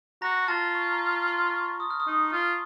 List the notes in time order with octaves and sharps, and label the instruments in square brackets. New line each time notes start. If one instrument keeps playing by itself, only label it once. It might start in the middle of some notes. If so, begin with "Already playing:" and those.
[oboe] F#4 [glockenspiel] A#5 A#6
[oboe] F4 [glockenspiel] A5 A6
[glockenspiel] C#6
A#5
A#5
C6
C#6
D#6
F6
D#6
[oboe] D#4
F4